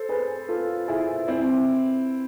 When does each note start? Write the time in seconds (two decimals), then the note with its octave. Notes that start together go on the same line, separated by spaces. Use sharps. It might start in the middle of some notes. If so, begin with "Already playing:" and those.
Already playing: A4 C5
0.09 G#4 B4
0.49 F4 A4
0.88 E4 G#4
1.28 C4 E4